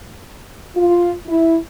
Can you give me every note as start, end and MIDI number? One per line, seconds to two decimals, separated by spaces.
0.76 1.13 65
1.27 1.57 64